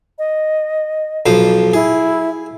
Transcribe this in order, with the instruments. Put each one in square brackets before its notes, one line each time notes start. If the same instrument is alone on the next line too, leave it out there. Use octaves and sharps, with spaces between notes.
[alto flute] D#5
[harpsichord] B1 F3 C5
[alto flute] E4 [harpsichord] G#4